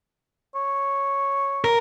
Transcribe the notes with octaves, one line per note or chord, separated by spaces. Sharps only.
C#5
A#4